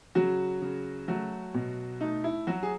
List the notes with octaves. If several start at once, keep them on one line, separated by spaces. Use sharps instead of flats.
C#3 F#3 F#4
C#3
F#3 A3 F#4
B2
A3 D#4
E4
F#3 F#4
G#4